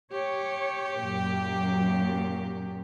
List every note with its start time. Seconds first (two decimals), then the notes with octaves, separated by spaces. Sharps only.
0.11 G4 C#5
0.99 F#2 A#2